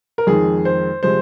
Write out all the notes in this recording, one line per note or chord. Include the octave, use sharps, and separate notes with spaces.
A#4
F2 D#3 G#3 G#4
C5
C3 F3 G#3 C5